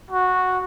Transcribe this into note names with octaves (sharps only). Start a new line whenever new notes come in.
F#4